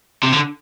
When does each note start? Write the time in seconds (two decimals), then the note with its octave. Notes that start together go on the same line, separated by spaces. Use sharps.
0.23 C3
0.33 D3